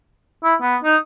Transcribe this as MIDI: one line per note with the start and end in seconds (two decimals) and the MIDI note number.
0.44 0.55 64
0.61 0.76 59
0.84 0.96 63